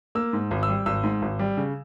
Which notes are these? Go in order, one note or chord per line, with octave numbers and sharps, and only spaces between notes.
A#3 E6
G#2
G#1
E6
G3
G#1 E6
G#2
G#1
G3
C#3